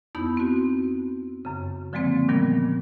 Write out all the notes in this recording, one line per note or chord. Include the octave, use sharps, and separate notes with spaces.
F2 B3 D#4 E4 B5 G6
C4 F#4
F#2 C#3
D3 F3 F#3 G#3 A#3 C4
A#2 D#3 F3 G3 B3